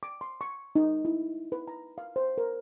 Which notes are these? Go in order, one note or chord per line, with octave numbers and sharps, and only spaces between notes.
D6
C6
C#6
D#4
E4
B4
A#5
F5
C5
A#4